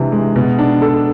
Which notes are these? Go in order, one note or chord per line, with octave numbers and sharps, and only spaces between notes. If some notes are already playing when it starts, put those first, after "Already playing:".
Already playing: C3 E3 G#3 D4
G#3
B2
D4
A4